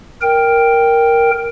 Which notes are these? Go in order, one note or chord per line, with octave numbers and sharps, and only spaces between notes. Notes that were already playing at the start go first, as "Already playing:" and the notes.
A#4 G5